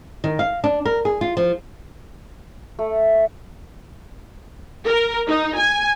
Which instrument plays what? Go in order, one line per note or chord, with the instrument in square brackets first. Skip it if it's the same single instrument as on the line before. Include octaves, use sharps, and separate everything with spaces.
[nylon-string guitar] D#3
F5
D4
A#4
G#4
F4
F3
[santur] A3
[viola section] A#4
D#4
G#5